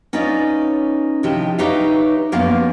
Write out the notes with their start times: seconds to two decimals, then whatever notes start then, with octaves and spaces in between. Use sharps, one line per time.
0.13 C#4 D#4 F4 B4 C#5 D5
1.23 C3 D#3 F3 E4 G4
1.58 D#4 G4 B4 C#5 E5 F5
2.32 F#2 F3 A#3 B3 C#4 F5